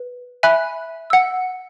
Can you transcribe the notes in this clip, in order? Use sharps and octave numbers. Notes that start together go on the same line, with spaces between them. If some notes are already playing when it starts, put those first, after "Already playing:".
Already playing: B4
E5 G#5 B5 F#6
F#5 E6